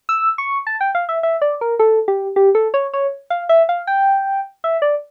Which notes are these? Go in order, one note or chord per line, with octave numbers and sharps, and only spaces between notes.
E6
C#6
A5
G5
F5
E5
E5
D5
A#4
A4
G4
G4
A4
C#5
C#5
F5
E5
F5
G5
E5
D5